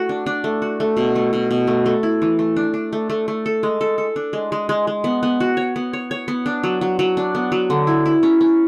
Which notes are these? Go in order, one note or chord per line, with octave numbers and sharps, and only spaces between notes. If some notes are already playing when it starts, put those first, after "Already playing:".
Already playing: A3 F#4
D4
D4
A3
F#4
A3
B2
A3
B2
B2
A3
A3
E4
E3
A3
D4
D4
A3
A3
A3
A4
G#3
A4
A4
D4
G#3
G#3
G#3
G#3
B3
B3
F#4
C#5
B3
C#5
C#5
B3
D4
F#3
F#3
F#3
D4
B3
F#3
D3
E4
E4
C#4
C#4